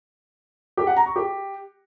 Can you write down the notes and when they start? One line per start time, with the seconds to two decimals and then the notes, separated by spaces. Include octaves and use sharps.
0.77 G4
0.87 F#5
0.97 A#5
1.06 C#6
1.16 G4